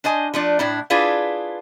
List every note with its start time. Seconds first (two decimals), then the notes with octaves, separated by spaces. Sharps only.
0.04 D4 C5 D#5 G#5
0.34 F3 A3 D4
0.59 A2 D4 E4
0.90 D4 E4 F4 G#4 B4